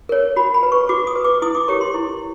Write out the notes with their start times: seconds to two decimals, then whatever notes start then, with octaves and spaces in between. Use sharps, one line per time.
0.09 A#4 C#5
0.36 F#4 B5
0.54 B5
0.63 B4
0.72 C#6
0.89 F#4 D6
1.07 D#6
1.16 B4
1.24 D6
1.42 E4 D#6
1.55 D6
1.68 G4 A#4 C#5 C#6
1.81 C6
1.94 E4